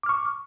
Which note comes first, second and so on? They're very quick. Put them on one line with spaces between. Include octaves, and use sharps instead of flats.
D6 F6 C#6